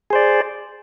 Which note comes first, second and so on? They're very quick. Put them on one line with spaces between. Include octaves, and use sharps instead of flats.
G#4 C5 D5